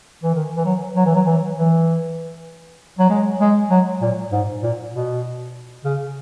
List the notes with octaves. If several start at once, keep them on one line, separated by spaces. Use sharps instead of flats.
E3
D#3
E3
F#3
F#3
E3
F#3
E3
E3
F#3
G#3
G#3
F#3
A#2
G#2
A#2
B2
C#3